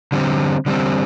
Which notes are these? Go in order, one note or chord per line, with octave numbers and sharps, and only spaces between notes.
D3 G3 C4
D3 G3 C4